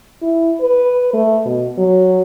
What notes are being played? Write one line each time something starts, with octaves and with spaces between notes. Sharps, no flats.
E4
B4
A3
B2
F#3